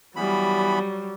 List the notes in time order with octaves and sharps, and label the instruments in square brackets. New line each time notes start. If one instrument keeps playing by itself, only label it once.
[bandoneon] E3 B3 B5 [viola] F#3 G3